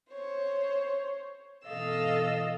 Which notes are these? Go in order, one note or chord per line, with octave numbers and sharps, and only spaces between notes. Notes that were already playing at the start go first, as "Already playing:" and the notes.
C5 C#5
B2 E3 A4 D#5 F5 E6